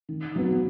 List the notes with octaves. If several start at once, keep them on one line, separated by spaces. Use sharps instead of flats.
D#3
F#3 B3